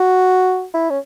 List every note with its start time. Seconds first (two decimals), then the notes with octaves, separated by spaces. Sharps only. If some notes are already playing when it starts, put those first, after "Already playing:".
Already playing: F#4
0.74 E4
0.90 C#4